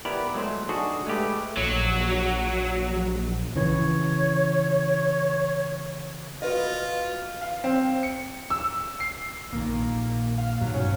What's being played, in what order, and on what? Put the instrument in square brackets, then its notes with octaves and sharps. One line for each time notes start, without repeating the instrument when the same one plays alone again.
[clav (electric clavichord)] B3 E4 G4 A#4 D5
F#3 G#3 A3 C5
D4 D#4 F#4 G#4 A4 D#5
G#3 A3 G4 B4
[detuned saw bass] A#1 [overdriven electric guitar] F#3
[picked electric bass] C#3 E3 [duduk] C#5
[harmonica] F4 [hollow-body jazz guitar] F#4 B4 D#5
[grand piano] F5
C4
C#7
E6
C7
[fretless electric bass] A#1 A#2 D#3 [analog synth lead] A#3
[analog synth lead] F5
[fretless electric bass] G2 B2 D#3 [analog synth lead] F#3
[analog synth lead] C#4